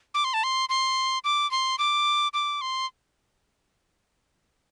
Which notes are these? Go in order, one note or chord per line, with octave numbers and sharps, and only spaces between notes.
D6
C6
A5
C6
C6
D6
C6
D6
D6
C6